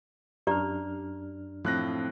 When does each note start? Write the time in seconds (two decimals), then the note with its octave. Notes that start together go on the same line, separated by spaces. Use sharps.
0.47 F#2 D4 G4 D5 A#5 F6
1.65 A2 F3 C4 F#6 A#6